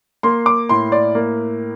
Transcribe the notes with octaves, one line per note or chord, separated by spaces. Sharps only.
A#3 C6
D6
A2 C6
D5
A#3